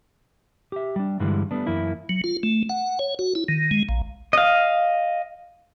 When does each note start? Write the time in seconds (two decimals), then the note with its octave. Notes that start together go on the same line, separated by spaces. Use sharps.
0.72 G4 E5
0.96 G3 D4
1.20 G2 D3 E3 G3 G#3
1.51 G3 A3 B3 D4
1.67 F#2 E3 A#3 E4
2.09 F#3
2.24 F4
2.43 A3
2.69 F#5
2.99 C#5
3.19 F#4
3.35 E4
3.48 D#3
3.71 G#3
3.89 A#1
4.33 D#5 F5